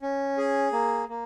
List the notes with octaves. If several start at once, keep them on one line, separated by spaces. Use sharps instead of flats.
C#4
G#4
A#3
A#3